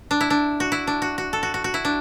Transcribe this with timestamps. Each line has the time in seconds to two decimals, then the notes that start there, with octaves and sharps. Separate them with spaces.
0.11 D4
0.21 E4
0.30 D4
0.60 F#4
0.72 E4
0.87 D4
1.02 F#4
1.18 F#4
1.33 A4
1.43 F#4
1.54 F#4
1.64 F#4
1.74 E4
1.85 D4